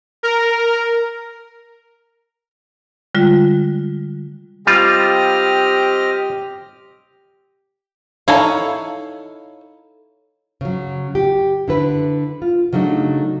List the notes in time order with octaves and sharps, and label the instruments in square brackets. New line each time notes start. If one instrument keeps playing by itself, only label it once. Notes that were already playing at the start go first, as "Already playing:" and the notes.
[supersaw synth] A#4
[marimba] D3 G3 G#3 F4
[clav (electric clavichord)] G3 F4 [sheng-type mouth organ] C4 D#5 F6 [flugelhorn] G4
[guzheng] D#4 E4 [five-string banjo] A4 C#5 F5
[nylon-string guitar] C#3 F#3
G4
D3 E4 B4
F4
C#3 F#3 A3 D4 D#4